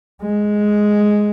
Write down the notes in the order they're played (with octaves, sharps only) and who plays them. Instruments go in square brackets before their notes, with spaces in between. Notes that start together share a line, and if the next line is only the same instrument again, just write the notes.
[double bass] G#3